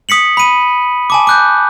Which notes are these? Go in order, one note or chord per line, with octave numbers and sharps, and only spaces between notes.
D#6 B6 C#7 F#7
B5 D#7
G#5 A5 D6
D6 F#6 G6